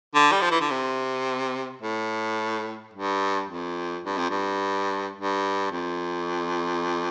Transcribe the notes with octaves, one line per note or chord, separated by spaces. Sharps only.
D3
G3
F3
E3
D3
C3
A2
G2
F2
G2
F2
G2
G2
F2